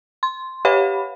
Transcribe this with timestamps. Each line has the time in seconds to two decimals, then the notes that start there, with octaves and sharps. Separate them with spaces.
0.23 C6
0.65 G4 B4 C#5 F5 F#5 B5